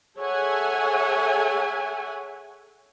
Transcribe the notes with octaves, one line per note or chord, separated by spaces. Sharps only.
G#4 A4 C#5 E5 F#5 G#5